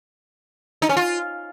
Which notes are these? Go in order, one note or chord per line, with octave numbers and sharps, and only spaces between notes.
D#4
C#4
F4